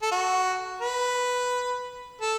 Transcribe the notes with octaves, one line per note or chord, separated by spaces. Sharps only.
A4
F#4
B4
A4